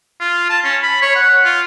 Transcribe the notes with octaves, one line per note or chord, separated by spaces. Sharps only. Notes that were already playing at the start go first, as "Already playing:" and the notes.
F4
A5
C#4
B5
C#5
F#5
F4